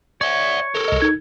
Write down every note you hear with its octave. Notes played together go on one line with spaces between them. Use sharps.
C#5 D5 E5
A4 A#4
C2 D#5
D#4 G#6